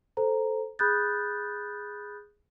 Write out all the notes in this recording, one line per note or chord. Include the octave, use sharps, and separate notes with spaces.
A4 C5 A#5
G#4 B5 D#6 F#6 G6 A6